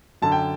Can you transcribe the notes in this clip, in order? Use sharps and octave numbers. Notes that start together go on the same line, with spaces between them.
F#2 D3 A5
G5